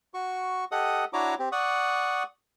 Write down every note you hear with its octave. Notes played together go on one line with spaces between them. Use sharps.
F#4 C#6
G4 A4 D#5 F#5 D#6
D4 E4 F#4 C#5 A#5 D6
C4 G4
D5 F#5 C#6 D#6